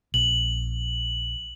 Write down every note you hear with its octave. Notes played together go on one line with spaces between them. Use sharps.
A#1 F#7